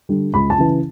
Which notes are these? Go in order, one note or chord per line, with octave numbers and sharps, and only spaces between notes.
D3 G3
C#2 B5
A5
C#3 E3